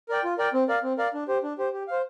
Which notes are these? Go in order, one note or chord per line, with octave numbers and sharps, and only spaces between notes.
A#4 D5 G5
F4
A#4 D5 G5
C4
A#4 D5 F5
C4
A#4 D5 F5
D4
G4 C5
D4
G4 C5
G4
C5 F5